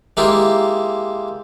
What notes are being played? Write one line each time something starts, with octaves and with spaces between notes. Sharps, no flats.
G#3 A#3 E4 F4 G4